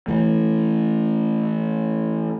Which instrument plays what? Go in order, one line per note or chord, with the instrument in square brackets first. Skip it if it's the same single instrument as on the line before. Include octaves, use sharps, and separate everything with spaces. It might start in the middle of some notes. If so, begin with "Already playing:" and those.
[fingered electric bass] E3 A3